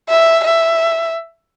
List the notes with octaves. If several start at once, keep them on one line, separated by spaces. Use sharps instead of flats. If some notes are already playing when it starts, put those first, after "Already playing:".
E5
E5